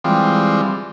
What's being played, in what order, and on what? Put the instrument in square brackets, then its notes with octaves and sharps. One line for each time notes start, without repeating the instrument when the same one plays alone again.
[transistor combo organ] E3 G3 G#3 C4 F4